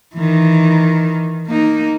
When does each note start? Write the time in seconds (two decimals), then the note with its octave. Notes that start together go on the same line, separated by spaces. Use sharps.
0.15 D#3 E3
1.47 A#3 D#4